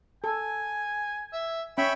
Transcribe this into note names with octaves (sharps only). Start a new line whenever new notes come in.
A4 G#5
E5
C#4 C#5 E5 G5 B5